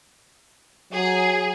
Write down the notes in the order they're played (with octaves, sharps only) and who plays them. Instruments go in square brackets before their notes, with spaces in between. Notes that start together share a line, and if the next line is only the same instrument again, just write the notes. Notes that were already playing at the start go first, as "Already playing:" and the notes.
[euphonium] F#3 [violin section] G#4